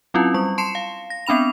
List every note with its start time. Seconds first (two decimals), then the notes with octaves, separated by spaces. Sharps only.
0.14 F#3 C4 C#4 E4 F4
0.34 G3 C#6
0.58 A5 C6 C7 C#7 E7
0.75 F5
1.10 A#6
1.26 B3 C4 D4 B5 F7